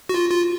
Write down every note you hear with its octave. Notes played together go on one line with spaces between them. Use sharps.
F#4
F4
F4